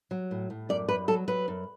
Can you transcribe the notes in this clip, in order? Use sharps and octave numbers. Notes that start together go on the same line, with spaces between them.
F#3
A2
A2
F#2 D5
F#2 B4
F#3 A4
F#3 B4
F#2